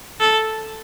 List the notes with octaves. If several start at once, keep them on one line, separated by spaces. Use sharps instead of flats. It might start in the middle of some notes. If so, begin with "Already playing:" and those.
A4